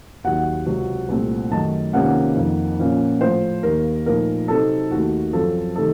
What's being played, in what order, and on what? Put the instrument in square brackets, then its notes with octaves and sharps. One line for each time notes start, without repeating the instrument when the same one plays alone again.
[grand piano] D#2 D#3 F#3 F#5
C#2 C3 F#3
C2 A#2 A3 C4
F#2 D#3 A3 D#4 A5
C#2 C3 D#3 A#3 C#4 F#5
F2 D#3 A#3
A#2 F3 A#3 C#4
A2 F3 A3 C5
D#2 D#3 A#3 A#4
A#2 F3 A3 D#4 A#4
C3 F#3 C4 D#4 A4
D#2 D#3 A3 F#4
F#2 F3 C4 A4
C3 D#3 A3 A4